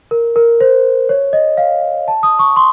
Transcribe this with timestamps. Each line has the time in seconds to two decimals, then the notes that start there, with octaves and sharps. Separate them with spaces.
0.11 A#4
0.36 A#4
0.61 C5
1.09 C#5
1.33 D#5
1.57 F5
2.08 A5
2.23 D#6
2.39 C#6
2.56 C6